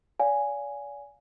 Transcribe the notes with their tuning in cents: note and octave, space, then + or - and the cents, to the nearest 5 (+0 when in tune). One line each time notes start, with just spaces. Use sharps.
D5 -40 F5 +25 G#5 +0